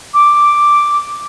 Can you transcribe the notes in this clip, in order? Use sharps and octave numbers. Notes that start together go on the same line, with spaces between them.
D6